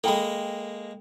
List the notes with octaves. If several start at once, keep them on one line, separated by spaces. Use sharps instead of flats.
G#3 A#3 A4 G5 B5